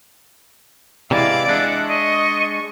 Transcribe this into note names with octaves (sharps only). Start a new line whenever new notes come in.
C3 E3 G#3 E4 D5 F5
G#3 D4 E5 F#5
D#5 C#6